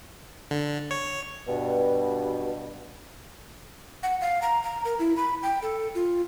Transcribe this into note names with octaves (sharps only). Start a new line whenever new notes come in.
D3
C#5
G2 B2
F#5
F5
A#5
A#5
A#4
E4
B5
G5
A4
F4